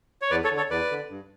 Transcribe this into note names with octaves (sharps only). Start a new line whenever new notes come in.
C#5
E2 B4 D5
A4 C#5
D3
A4 C#5
E2 B4 D5
D3
G2